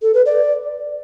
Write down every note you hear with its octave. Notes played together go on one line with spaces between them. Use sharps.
A4
B4
D5